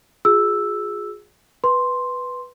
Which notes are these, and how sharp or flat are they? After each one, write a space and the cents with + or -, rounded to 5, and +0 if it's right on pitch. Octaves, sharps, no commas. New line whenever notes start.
F4 +45 G#4 +0 E6 +0
B4 +0 C6 +0